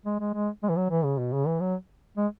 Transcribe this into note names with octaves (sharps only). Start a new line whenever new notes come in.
G#3
G#3
G#3
G#3
E3
F#3
E3
C#3
B2
C#3
E3
F#3
G#3